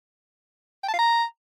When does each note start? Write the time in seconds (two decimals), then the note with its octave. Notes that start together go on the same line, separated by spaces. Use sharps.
0.83 G5
0.88 A5
0.93 F5
0.99 A#5